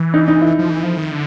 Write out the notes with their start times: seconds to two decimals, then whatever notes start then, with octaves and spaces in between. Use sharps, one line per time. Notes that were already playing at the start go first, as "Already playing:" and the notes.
Already playing: E3
0.14 D#4
0.28 D#4
0.42 E4
0.59 F3
0.70 E3
0.83 F3
0.97 D#3
1.11 D3